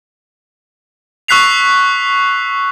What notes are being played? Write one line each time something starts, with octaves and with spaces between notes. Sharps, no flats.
C#6 E6 F#6 B6 C7 F7